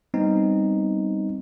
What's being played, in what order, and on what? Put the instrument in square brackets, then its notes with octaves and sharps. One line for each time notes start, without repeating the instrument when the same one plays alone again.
[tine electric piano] G3 B3 C4 D#4